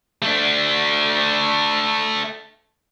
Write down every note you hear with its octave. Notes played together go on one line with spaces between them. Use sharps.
A3 D4